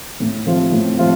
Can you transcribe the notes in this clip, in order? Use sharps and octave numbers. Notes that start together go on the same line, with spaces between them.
A2
F3 A3 C4 F4
A2
F3 A3 C4 F4